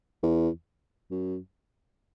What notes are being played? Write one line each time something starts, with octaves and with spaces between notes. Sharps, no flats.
E2
F#2